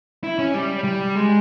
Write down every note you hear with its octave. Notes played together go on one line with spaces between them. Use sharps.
E4
C#4
G3
G3
G#3